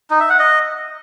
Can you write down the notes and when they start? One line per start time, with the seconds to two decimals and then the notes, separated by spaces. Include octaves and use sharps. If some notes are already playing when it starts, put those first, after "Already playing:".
0.10 D#4
0.20 E5
0.30 F#5
0.39 D#5